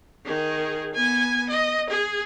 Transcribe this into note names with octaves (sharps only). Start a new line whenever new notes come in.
D#3 G#4
B3 G#5
D#5
G#4